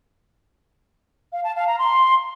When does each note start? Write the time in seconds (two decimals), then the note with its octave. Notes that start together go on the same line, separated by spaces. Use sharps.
1.33 F5
1.44 A5
1.56 F5
1.67 A#5
1.79 C6